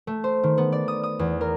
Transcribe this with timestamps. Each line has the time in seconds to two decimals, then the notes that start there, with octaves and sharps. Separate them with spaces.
0.07 A3
0.24 C5
0.44 D#3
0.58 B3
0.72 D5
0.88 D#6
1.03 D#6
1.19 E2
1.41 A#4